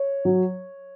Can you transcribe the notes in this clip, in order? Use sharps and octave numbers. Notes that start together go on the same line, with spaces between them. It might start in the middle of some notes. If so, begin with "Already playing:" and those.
Already playing: C#5
F#3